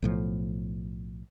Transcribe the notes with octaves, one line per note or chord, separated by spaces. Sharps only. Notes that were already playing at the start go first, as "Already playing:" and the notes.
B1 A2 F3